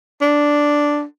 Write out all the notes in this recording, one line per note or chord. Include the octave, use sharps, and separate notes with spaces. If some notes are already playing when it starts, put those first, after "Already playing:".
D4